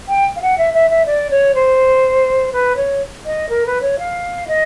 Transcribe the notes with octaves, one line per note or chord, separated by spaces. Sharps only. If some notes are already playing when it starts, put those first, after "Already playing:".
G5
F5
F#5
E5
E5
E5
D5
C#5
C5
B4
C#5
D#5
A#4
B4
C#5
F5
D#5